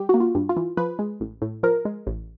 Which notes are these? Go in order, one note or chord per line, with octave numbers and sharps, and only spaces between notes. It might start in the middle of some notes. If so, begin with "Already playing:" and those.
Already playing: G3 G4
A#3 F#4
F4
G2
F4
E3
F3 B4
G#3
A1
A2
F3 A#4
G#3
A1